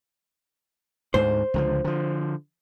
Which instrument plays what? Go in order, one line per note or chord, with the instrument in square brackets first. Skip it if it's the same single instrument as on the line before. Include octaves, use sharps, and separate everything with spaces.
[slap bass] D2 G#2 [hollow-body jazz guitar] C5
[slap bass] C#2 D3 F3
D3 F3